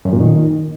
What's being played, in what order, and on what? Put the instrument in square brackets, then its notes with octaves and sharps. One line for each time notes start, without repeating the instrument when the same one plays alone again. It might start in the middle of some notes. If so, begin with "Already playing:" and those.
[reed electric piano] F#2
A#2
D#3